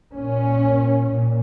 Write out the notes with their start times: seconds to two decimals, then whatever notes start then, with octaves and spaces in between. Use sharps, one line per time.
0.16 A#2 C#4
1.09 A#2